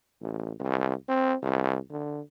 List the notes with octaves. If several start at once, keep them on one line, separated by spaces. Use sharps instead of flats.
A1
C2
C4
C2
D3